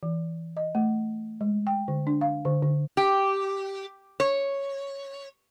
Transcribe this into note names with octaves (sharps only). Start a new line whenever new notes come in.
E3
D#5
A3
G#3
G5
D3
D4
F5
D3
D3
G4
C#5